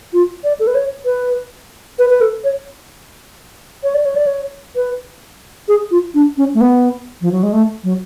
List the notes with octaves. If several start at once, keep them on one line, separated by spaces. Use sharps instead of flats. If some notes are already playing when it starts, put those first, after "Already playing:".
F4
D5
A4
B4
C#5
B4
B4
B4
A4
C#5
C#5
D5
C#5
D5
C#5
B4
G#4
F4
D4
C#4
A3
B3
F3
F#3
G#3
A3
F#3